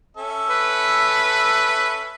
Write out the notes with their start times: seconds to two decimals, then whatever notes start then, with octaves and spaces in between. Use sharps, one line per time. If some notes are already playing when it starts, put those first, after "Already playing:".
0.17 C#4 A4 E5
0.50 B4